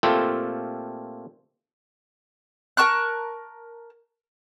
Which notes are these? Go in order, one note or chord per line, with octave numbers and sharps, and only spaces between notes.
A#2 A3 C4 F4 G4 A4
A#4 A5 C#6 F#6